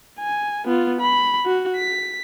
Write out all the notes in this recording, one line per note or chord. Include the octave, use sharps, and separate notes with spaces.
G#5
B3 F4
B5
F#4
B6